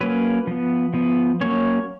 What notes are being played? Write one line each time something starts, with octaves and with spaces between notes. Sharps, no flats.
F#3 A#3 C#4 B4
F3 B3
F3 B3
F#3 A#3 C#4 C#5